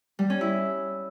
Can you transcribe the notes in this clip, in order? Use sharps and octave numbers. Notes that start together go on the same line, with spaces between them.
G3
C#4
E4